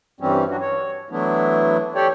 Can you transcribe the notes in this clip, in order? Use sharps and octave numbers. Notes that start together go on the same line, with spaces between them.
G2 E3 G3 C4 C#4
F#3 D4 F#4
C#5
E3 F#3 A3 B3 D4 E4
G4 A4 C#5 D5 G5